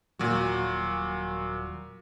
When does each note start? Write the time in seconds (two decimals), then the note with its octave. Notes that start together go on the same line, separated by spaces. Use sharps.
0.19 D#1 A#2 F#3 F#4